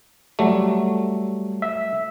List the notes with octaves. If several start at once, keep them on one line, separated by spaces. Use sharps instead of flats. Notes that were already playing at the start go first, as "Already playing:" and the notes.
F#3 G3 A3
E5